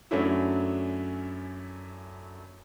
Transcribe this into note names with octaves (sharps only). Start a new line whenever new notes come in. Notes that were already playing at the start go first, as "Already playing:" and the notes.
F#2 F#3 A3 C#4 D4 E4